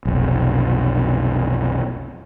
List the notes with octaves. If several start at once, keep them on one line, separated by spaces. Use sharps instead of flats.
F1 B1